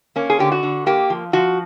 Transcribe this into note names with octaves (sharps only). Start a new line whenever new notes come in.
A#3 C#4
G#4
D3 G4
F#4
D3
A#3 G4
F3
F3 F#4